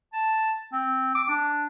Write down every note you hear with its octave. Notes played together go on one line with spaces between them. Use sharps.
A5
C4
D6
D4